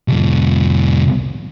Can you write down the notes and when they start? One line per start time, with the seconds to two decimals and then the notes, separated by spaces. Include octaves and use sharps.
0.08 C2 F2